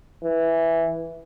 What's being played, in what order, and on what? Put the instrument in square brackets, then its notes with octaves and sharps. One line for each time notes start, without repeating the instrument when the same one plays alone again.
[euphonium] E3